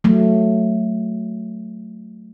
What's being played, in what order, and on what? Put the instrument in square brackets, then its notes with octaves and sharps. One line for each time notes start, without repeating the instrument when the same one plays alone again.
[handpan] F#3 A3